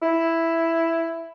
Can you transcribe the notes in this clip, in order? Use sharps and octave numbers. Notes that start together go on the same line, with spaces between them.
E4